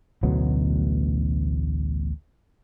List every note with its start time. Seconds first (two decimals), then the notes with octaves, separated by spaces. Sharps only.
0.23 A1 D2 B2 F#3